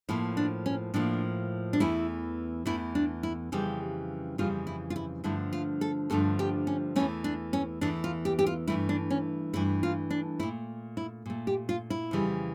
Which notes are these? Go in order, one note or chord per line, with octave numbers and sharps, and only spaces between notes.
A2 F3 A#3 E4
D4
C#4
A2 F3 A#3 D4
D4
E2 E3 A3 E4
E2 E3 A3 E4
D4
E4
F2 C#3 E3 G3 G4
F2 C#3 E3 G3 F4
E4
F4
E4
G2 D3 F3 A3 E4
F4
A4
G2 D3 F3 A3 A4
G4
C#4
E2 E3 A3 C#4
D4
C#4
E2 E3 A3 D4
F4
G4
G4
F4
G2 E3 A3 E4
D4
C#4
G2 E3 A3 E4
F4
D4
A#2 A3 E4
E4
A#2 A3
G4
F4
E4
F2 C#3 E3 G3